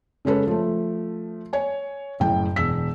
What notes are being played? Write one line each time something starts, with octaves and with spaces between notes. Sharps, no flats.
C#3 G#3 C#4 A4 B4
F3 A3
C#5 G#5
F#1 A2 G5
E1 E6 B6